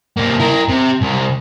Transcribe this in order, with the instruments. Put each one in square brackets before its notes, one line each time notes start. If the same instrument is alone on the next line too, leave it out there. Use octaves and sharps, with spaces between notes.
[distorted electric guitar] C3 A#3
E4 A#4
C3
C2